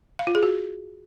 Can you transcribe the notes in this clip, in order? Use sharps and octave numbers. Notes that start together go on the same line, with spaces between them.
F5
F4
G#4
F#4